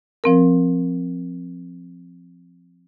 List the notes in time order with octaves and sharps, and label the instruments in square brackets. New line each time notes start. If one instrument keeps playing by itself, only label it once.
[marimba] F3 C4 A#4